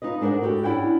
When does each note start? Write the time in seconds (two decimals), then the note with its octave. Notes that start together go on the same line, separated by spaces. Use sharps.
0.02 D#4 F4 B4 D#5
0.21 G#3 D4 A#4 C5 F#5
0.42 E4 F#4 G4 A4
0.63 C#4 D4 E4 F#5 G5